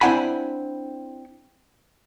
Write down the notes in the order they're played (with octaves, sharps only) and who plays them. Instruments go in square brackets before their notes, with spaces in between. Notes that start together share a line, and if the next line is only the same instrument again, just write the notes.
[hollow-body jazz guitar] C4 D4 E4 F#5 G#5 B5